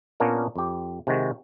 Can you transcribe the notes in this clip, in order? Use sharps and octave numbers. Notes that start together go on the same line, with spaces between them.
A#2 A#3 B3 C#4 D4 A#4
F2 G4
C3 D#3 G#3 F#4